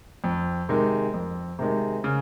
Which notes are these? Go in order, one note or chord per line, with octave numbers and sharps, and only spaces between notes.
F2
C3 D#3 G#3
F2
C3 D#3 G#3
C#3